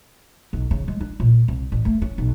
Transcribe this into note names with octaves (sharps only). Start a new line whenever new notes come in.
B1
C#3
G#3
D4
A#2
C2
A1
A3
C#4
B1